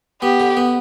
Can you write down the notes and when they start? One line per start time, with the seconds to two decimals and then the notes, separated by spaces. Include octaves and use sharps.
0.22 B3 G4
0.40 D3
0.57 B3